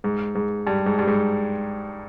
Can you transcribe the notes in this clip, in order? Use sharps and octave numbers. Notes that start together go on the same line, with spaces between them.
G#2
G#2
G2
G#2
G2
G#2